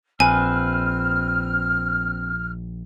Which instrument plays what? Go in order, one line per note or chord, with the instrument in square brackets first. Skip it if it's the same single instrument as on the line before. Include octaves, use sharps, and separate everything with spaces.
[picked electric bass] A#1 [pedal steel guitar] C4 B4 [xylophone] G#5 [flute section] F6